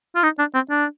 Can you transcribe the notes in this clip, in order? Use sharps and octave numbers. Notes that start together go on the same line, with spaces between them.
F4
D#4
D4
C4
D4